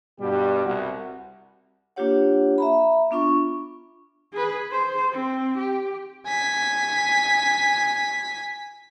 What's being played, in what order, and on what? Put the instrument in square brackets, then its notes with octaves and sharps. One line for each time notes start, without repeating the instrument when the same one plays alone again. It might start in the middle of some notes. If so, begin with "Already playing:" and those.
[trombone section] G2 B2 G3 F#4 G4
C2 F#4
[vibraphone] A#3 D4 F4 G4 C#5 F#5
E5 A#5 B5
B3 D4 F4 C#6
[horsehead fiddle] G#4 B4
G#4 C5
C4
G4
[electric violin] G#5 B6